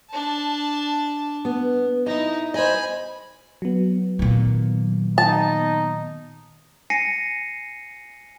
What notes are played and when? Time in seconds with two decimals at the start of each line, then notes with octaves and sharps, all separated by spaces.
0.11 D4 A5
1.45 B3
2.06 D#4 E4 D#5
2.54 C5 D#5 G#5 B5
3.62 F#3 B3
4.19 A#2 D#3
5.18 D#4 A5
6.90 G#5 A#6 C7 C#7 D#7